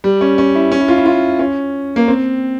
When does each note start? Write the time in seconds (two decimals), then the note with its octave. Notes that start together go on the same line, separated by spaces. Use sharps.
0.04 G3
0.21 C#4
0.38 C#4
0.55 E4
0.72 C#4
0.81 E4
0.88 F4
0.98 E4
1.06 F4
1.39 C#4
1.96 A#3
2.08 C4